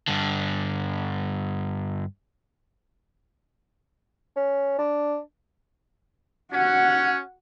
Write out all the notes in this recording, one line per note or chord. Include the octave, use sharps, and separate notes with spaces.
G2 D3
C#4
D4
C#4 F#4 F#5